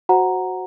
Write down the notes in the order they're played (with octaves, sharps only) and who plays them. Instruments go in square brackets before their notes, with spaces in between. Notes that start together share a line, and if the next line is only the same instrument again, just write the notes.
[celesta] F#4 C5 F#5 A#5